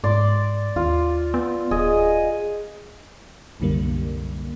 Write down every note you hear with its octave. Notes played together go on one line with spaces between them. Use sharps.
G#2 D5 C6 D6
D#2 F4
B3
D1 G#4 D#5
C2 F#2 D3 G3 A#3